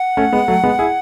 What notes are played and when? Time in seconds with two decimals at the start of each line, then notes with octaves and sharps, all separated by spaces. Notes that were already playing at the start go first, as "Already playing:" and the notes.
Already playing: F#5
0.17 A3 C#4
0.33 G#3 B3
0.48 F#3 A3
0.63 G#3 B3
0.79 E4 G#4